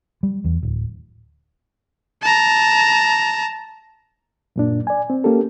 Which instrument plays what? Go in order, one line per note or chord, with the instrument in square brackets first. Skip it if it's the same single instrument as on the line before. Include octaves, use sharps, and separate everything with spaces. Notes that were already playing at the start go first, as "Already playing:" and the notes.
[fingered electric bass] G3
E2
D1
[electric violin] A5 A#5
[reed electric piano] F#2 A#2 D4
D5 G#5
C4
A#3 C#4 G4 A4